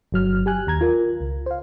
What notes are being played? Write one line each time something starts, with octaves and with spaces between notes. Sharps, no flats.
G1 F#3 F6
G4 G#5 F#6
D#2 A#5 G#6
F4 A#4
C#2
C5 F5